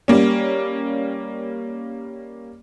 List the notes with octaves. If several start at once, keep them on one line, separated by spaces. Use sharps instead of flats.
G3 A#3 C#4